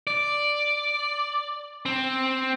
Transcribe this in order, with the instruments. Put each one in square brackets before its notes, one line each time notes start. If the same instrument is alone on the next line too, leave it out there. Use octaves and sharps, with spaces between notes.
[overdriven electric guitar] D5
C4